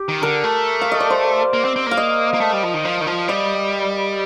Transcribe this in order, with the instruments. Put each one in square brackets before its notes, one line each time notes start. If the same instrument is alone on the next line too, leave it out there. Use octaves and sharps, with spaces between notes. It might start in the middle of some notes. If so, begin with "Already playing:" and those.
Already playing: [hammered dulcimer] G4
[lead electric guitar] D#3
[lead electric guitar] D3 [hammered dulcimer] A#4
[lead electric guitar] A3
[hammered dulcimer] F5
D#5
D5
C5
[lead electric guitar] A#3
C4
C4
[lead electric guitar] A#3 [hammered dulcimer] F5
[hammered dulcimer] D#5
[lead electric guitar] A#3
A3
G3
F3
D#3
F3
D#3
F3
[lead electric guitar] G3 [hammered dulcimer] D#5